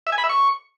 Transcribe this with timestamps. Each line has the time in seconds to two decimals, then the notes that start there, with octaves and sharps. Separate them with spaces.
0.07 E5
0.12 G#5
0.18 B5
0.24 E5
0.29 C#6